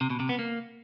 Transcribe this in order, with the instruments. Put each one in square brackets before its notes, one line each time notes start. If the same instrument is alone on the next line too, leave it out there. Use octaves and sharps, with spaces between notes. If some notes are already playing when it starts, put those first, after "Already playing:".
[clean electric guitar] C3
B2
C3
B3
A#3